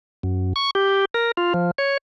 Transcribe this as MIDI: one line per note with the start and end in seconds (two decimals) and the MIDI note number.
0.23 0.53 42
0.56 0.70 85
0.75 1.05 67
1.14 1.31 70
1.37 1.53 65
1.54 1.71 53
1.78 1.97 73